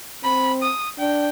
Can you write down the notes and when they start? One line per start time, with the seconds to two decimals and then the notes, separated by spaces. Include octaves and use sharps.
0.24 C4 B5
0.62 D#6
0.99 D4 G5